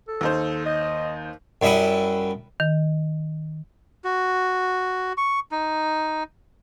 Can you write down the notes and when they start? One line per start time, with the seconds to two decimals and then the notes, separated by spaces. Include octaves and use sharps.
0.08 A4
0.21 D#2 D#4 C5
0.65 D#5
1.62 F#2 G3 E4 D#5 F#5
2.60 D#3
4.04 F#4
5.17 C#6
5.51 D#4